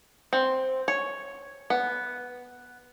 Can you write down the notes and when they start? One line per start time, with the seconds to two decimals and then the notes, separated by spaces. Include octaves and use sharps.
0.33 C4
0.88 C#5
1.70 B3